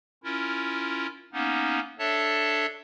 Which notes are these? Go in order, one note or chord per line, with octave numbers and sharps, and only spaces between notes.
C#4 E4 F4 A#4
A#3 B3 C#4 D#4
D4 A4 C#5 E5 A5